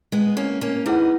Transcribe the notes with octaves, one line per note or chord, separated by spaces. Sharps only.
G#3 B3
A#3 C#4
A#3 C#4
B3 D#4 E4 G#4 B4 F#5